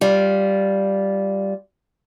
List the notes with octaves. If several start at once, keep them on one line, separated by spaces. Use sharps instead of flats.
G3 F4